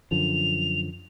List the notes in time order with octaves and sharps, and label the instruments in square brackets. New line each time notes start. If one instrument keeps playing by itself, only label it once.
[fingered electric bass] F#2 D3 F3 [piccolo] F7